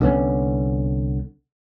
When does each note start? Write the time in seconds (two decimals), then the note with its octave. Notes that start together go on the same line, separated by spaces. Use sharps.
0.01 C2 D3 B3 C#4